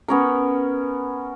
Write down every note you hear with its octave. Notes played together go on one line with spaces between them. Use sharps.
B3 C#4 A#4